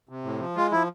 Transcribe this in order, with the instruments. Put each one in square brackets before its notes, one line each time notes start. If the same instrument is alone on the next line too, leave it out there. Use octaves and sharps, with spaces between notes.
[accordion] C3
A2
F3
G#3 F4
F3 E4